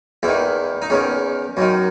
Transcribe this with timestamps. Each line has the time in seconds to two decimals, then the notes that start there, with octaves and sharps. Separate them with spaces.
0.23 E2 D#3 E4
0.82 D#4
0.90 E2 D#3 C#4
1.57 F#2 D#3